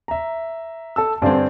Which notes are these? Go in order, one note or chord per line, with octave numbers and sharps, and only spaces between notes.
E5 A#5
A4 A5 E6
G2 D3 C4 C5 D5 G#5